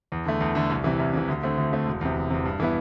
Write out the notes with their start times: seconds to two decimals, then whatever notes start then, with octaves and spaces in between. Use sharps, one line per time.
0.12 E2
0.25 D3 A3
0.41 E2
0.55 D3 A3
0.70 C2
0.84 C3 E3
1.00 C2
1.14 C3 E3
1.28 D2
1.43 D3 A3 C4
1.58 D2
1.73 D3 A3 C4
1.87 E1
2.01 E2 C3
2.16 E1
2.30 E2 C3
2.45 G2
2.60 E3 B3 E4